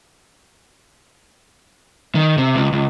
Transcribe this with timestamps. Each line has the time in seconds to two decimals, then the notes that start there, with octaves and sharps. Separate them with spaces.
2.15 D#3
2.38 C3
2.56 C#2
2.73 C#2